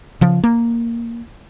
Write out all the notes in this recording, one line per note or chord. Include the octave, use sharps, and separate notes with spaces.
C#3 F3
A#3